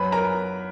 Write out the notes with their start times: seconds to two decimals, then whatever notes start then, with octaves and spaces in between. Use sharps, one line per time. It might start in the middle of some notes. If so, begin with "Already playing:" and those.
Already playing: F#2 B4 B5
0.12 A#4 A#5